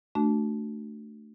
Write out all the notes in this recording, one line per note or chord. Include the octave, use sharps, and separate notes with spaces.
A3 D4 F#4